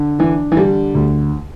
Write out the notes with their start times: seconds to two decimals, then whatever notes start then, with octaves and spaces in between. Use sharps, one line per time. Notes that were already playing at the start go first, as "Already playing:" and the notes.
Already playing: D3
0.19 E3 D4
0.52 E3
0.57 D3 G3
0.95 D2